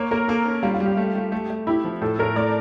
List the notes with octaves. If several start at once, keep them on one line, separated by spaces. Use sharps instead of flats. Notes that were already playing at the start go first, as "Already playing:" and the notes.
Already playing: A#3 C#5
A#3 A#4
A#3 A4
C#4
G3 F4
F4
G3
G4
A3
A3
A3
A3
E4 G4
F3
A2 A4
A2 A#4
A3 D5